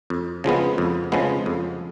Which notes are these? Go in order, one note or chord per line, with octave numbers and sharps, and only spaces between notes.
F2
C#3 F3 G#3 B3
F2
C#3 F3 G#3 B3
F2